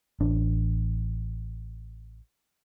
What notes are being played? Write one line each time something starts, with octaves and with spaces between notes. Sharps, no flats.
A1 D4